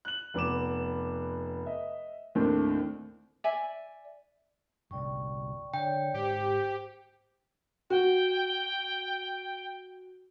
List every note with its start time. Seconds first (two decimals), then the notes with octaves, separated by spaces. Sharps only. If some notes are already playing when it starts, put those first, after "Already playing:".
0.05 F#6 F#7
0.34 F1 B3 D6 E7
1.66 D#5 E5
2.35 D#2 A2 A3 C4 D4
3.44 D5 E5 G#5
4.91 G1 C2 D5 G5 C#6
5.74 D3 C#5 D5 G5
6.14 G#1 G#2 G4 C5
7.90 F#4 G5